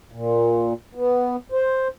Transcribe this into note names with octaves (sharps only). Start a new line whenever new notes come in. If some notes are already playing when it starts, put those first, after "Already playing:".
A#2
B3
C5